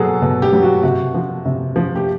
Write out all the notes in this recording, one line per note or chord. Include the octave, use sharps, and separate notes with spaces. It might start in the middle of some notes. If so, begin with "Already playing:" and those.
Already playing: B2 F#3 G#4 A4
B2
G4
F#3
F#4
C3 F#4
F3
C3
F3
G4